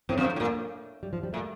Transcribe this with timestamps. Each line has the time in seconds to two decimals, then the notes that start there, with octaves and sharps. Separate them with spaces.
0.09 A2 C4
0.18 F2
0.25 G2
0.36 A2
0.40 A#2 A#3
1.03 G3
1.13 F3
1.23 G3
1.33 A#2 A3